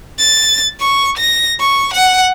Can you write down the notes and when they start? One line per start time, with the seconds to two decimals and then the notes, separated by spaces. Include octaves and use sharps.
0.19 A6
0.80 C#6
1.18 A#6
1.60 C#6
1.93 F#5